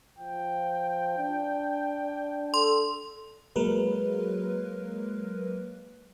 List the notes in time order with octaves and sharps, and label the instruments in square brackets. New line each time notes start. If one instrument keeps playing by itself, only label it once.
[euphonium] F3 [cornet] G5
[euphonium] D4
[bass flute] A4 [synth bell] C6
[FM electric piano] F#3 G#3 A#3 A#4 B4